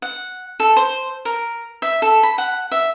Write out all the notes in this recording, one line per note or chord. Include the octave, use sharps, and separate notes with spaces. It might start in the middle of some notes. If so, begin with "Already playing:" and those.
F#5
A4
C5
A#4
E5
A4
B5
F#5
E5